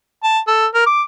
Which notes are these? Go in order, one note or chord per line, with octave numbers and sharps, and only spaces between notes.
A5
A4
A#4
D6